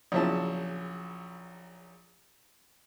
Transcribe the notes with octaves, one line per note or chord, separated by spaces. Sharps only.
A#1 C#3 F#3 C#4 E4 A5